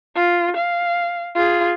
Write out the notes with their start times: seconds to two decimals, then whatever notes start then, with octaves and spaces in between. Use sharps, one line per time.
0.16 F4
0.56 F5
1.35 F4 G#4